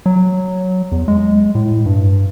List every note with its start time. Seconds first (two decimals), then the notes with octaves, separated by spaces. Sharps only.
0.06 F#3
0.92 E2
1.08 G#3
1.55 A2
1.86 G2